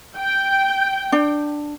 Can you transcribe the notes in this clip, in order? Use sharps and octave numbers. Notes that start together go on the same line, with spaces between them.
G5
D4